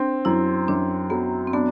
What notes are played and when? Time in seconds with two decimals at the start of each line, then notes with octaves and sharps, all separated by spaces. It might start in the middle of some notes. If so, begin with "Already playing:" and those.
Already playing: C4 D4
0.25 F#2 E4
0.68 F#2 D4
1.10 F#3 B3
1.47 C4
1.53 B3 D4